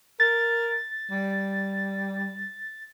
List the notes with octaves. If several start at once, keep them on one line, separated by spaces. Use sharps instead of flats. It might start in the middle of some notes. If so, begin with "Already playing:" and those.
A#4 A6
G3